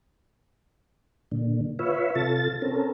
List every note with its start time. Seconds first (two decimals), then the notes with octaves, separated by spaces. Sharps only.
1.32 A#2 D3
1.79 F4 B4 C#5 E5
2.15 C3 F4 A4 A6
2.62 C4 C#4 A4 A#4